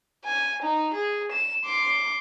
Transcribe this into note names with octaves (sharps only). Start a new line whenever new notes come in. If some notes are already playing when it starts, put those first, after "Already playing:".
G#5
D#4
G#4
E7
C6 D6